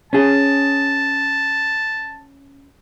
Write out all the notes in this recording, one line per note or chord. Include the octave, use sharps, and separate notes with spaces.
C#4 G#4 A5